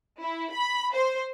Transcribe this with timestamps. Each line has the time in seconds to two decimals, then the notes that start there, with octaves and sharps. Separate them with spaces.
0.22 E4
0.52 B5
0.94 C5